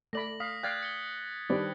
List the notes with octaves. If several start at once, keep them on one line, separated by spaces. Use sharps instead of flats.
A3 D5 B5 A#6 F#7
F5 D#6 B6
D5 F5 G5 F#6 G#6 A6
C#7 G7
D#3 G3 D4 B4 C5 D5